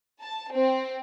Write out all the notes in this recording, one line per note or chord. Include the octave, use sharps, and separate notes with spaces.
A5
C4